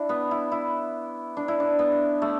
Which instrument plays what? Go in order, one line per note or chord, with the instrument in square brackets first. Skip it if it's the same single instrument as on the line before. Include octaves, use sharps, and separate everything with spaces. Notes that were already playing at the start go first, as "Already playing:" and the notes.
Already playing: [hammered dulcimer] D4 E4
B3
E4
E4
D4
E4
D4
B3
A3